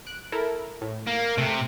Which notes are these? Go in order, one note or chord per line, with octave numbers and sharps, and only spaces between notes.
F#6 D7
E4 A4 A#4
A2
A#3
C3 A3 F#6